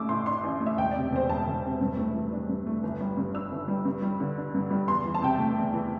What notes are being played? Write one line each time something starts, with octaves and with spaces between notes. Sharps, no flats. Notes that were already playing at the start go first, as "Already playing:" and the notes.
Already playing: A1 A3 D6 E6
A2 C6
D4 C6
A1
A3
E5
E1 G5
D5
C3
E2 C5
E1 A5
E1
C3
G2
A3
E3
D4
G2
A3
G1
G3
G2
D4 E6
G1
G3
G2
G3
D3
D4
G2
G3
E2 C6
E3
A5
C3 G5
A3 A5
E2
E3